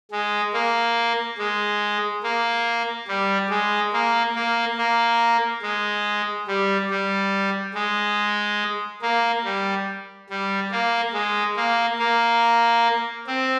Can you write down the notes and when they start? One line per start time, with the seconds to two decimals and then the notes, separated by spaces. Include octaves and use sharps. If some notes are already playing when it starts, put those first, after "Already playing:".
0.12 G#3
0.53 A#3
1.38 G#3
2.23 A#3
3.08 G3
3.50 G#3
3.93 A#3
4.35 A#3
4.78 A#3
5.62 G#3
6.47 G3
6.90 G3
7.74 G#3
9.02 A#3
9.44 G3
10.30 G3
10.71 A#3
11.13 G#3
11.56 A#3
11.99 A#3
13.27 C4